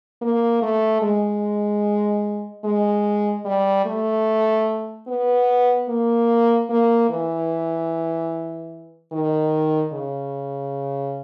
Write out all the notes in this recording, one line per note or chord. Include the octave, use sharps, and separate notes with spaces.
A#3
A3
G#3
G#3
G3
A3
B3
A#3
A#3
E3
D#3
C#3